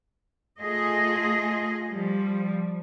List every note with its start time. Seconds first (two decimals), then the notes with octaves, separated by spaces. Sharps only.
0.60 A3 F4 G#4 D#5
1.89 F3 G3